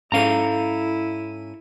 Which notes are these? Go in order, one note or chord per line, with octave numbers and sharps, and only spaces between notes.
G#2 C#4 E4 A4 F5 A#5 D#7